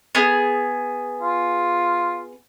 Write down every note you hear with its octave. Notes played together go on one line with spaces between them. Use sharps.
B3 G#4
F4